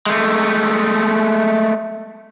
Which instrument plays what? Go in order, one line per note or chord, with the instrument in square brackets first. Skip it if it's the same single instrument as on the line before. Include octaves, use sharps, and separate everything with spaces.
[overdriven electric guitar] G#3 A3